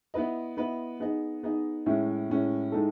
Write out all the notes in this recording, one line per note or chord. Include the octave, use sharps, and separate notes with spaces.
B3 E4 B4 D#5
B3 E4 B4 D#5
B3 D#4 G#4 D#5
B3 D#4 G#4 D#5
A2 G#3 C#4 E4
A2 G#3 C#4 E4
A2 G#3 D#4 A4